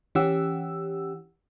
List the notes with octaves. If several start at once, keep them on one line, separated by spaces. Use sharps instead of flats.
E3 C#4 G4 F#5 E6